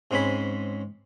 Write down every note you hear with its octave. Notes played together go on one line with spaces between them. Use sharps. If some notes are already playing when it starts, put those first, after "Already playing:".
G#2 G#3 C4 C#4 G#5 B5